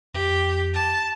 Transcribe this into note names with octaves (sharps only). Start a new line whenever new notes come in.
F2 G4
A5